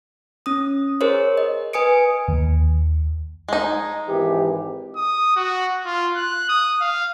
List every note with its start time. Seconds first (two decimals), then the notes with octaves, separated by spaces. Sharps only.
0.46 C#4 D#6
1.01 G#4 A#4 C5 C#5
1.37 D#5
1.73 B4 G#5 D#6 C#7 D7
2.28 D#2
3.48 G#3 D#4
4.08 G#1 E3 G4
4.96 D#6
5.36 F#4
5.85 F4
6.16 F#6
6.49 D#6
6.81 F5